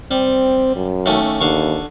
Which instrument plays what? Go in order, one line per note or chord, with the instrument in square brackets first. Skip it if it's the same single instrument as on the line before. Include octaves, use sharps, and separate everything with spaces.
[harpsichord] G3 [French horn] C4
[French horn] F#2
[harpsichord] D#2 A3 C#4
[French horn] D#2 [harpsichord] D3 F5 C#6